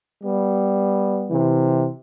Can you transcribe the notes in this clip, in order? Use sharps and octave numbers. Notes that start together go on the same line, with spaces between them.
G3 B3
C3 E3